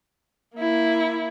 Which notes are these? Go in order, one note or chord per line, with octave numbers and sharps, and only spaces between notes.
A#3 E4